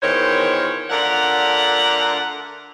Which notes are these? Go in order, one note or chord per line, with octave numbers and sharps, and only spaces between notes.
E2 A#2 D#3 C5 C#5
D3 A3 F4 A#4 D5 F#5